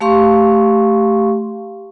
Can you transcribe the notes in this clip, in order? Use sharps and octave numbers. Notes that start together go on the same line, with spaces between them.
A3 G4 F5 C6 C#6